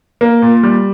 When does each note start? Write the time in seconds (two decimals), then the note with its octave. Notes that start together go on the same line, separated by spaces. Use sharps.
0.21 A#3
0.42 A#2
0.63 G3